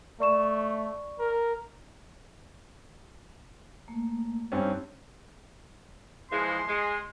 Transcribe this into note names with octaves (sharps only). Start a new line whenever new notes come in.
A3 D5 C#6 E7
A#4
A3 A#3
G2 C4 C#4 D#4
E3 F3 G#3 C6
G#3